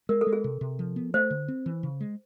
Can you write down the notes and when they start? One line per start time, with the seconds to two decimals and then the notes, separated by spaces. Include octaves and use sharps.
0.09 G#3 A#4
0.21 A4
0.27 G#3
0.33 G#4
0.44 C3
0.61 C3
0.79 F3
0.96 B3
1.14 A3 C5
1.30 D3
1.48 C4
1.66 E3
1.83 C#3
2.01 G#3